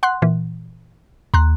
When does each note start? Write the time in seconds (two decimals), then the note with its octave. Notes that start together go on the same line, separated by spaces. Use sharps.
0.03 F#5 C6 F#6
0.22 A#2 E3
1.34 D#2 A#5 C6 F#6